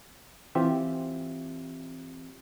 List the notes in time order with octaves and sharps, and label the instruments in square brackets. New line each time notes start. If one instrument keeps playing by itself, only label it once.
[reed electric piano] E3 C4 F4 G4 E5